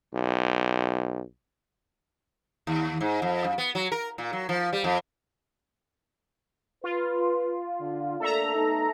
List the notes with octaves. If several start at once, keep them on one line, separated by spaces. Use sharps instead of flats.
B1
D#2
G#2
F2
F#2
B3
F#3
A#4
A#2
F#3
F3
G3
F2
F4 B4
D3
A3 A#3 D4 A4 E5 A#5
A3 B3 D#4